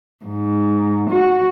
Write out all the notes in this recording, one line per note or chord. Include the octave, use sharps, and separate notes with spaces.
G#2
F#4